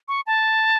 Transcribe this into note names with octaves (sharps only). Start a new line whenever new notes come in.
C#6
A5